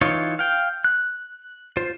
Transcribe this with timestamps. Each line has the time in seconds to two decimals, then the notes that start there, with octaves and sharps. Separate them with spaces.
0.01 E3 D#4 F4 C#5
0.39 F5 G5
0.84 F#6
1.77 F4 C5